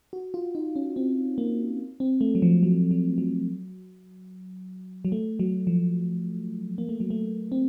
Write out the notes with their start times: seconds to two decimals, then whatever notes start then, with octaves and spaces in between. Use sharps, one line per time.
0.13 F#4
0.34 F4
0.55 D#4
0.76 C#4
0.96 C4
1.38 A#3
2.00 C4
2.21 A3
2.35 F#3
2.42 F3
2.63 F#3
2.91 F#3
3.18 F#3
5.05 F#3
5.12 A3
5.39 F#3
5.67 F3
6.78 A#3
6.89 A3
7.00 F#3
7.10 A3
7.52 C4